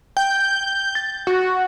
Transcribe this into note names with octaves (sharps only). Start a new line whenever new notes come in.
G5 G6
A6
F#4